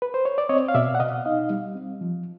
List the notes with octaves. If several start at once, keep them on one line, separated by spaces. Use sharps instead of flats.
B4
C5
C#5
D5
C4 C#5 D#5
F5
B2 D5 E5
F#5
B2 D#5 F5
D#4 D#5 F5
G3
C4
F3